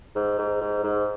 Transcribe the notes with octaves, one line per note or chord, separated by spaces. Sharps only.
G#2
G#2
G#2
G#2